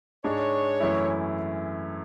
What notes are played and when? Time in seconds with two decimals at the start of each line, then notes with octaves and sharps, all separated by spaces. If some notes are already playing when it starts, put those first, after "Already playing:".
0.24 G#2 G#3 D4 C#5
0.80 F#2 E3 A3 C#4 E4